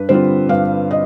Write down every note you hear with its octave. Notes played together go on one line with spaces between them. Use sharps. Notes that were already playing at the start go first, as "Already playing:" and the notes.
Already playing: G2 B4
D3 G3 C4 F4 C5
G2 F5
D#5